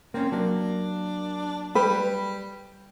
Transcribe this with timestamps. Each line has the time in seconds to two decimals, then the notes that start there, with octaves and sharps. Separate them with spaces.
0.14 A#3 C4 C#4
0.32 F#3 A#3 D4
1.75 G3 B4